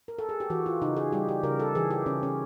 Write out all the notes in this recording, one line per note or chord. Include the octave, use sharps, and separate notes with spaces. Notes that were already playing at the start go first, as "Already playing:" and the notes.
A#4
A4
G#4
G4
E3 F#4
F4
C#3 D#4
G#4
G3 G4
G4
C#3 A#4
A4
E3 G#4
G4
C#3 C#4
C#4